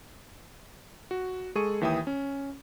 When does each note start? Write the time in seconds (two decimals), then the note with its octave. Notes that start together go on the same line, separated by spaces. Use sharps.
1.11 F#4
1.55 G#3 G#4 A4 C#6 D#7
1.81 D#2 E3 E5 G5 D#6
2.07 C#4